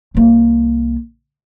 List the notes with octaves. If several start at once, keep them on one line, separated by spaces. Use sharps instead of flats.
C2 A#3